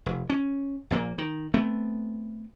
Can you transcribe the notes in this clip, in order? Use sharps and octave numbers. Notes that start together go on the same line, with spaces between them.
F1
C#4
A#1 A#2 A#3
D#3
A3 B3 C4